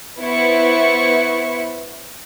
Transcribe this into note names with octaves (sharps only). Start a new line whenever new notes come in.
B3 E4 C5 C#6